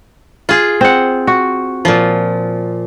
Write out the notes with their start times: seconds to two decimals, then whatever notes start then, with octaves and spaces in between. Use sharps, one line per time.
0.49 F4 G#4
0.81 C4 F#5
1.27 F#4
1.85 A#2 F3